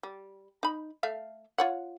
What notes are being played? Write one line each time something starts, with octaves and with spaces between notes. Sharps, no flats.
G3
D#4 B5
A3 E5 F5
F4 C#5 F#5